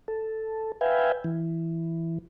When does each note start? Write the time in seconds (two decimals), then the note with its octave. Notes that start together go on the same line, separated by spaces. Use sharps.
0.08 A4
0.81 B4 E5 F5 G5 G#5
1.24 E3